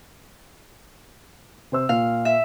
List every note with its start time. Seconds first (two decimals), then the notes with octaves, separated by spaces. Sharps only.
1.72 C3 C5 E6
1.89 A#2 F5
2.25 E5